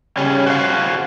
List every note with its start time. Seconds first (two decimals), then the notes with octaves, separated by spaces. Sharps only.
0.17 C#3 G3 C#4
0.46 F#4 C5 F5